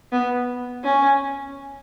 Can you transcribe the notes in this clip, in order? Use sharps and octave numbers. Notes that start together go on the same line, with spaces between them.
B3
C#4